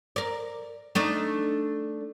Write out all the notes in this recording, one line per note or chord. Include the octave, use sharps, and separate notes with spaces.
A#4 D5
A3 D4 D#4